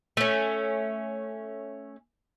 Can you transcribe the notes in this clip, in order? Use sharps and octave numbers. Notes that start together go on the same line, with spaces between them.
A3 C#4